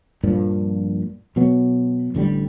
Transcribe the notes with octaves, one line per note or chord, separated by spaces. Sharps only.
A#1 G2 A#2 F3
B2 F#3 B3
A1 D3 D#3 G3